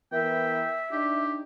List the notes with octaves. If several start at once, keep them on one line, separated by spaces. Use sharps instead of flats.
E3 B3 A#4 E5 G5
D4 D#4 G4